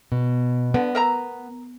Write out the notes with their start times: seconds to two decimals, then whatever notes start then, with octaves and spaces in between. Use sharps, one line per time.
0.12 B2
0.74 D3 B3
0.95 A#4 E5 A#5